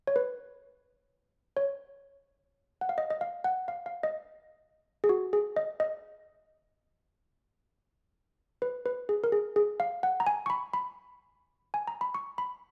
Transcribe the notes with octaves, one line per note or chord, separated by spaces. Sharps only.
C#5
B4
C#5
F#5
F5
D#5
D#5
F5
F#5
F5
F5
D#5
G#4
F#4
G#4
D#5
D#5
B4
B4
G#4
A#4
G#4
G#4
F5
F#5
A#5
G#5
C#6
B5
B5
G#5
A#5
B5
C#6
B5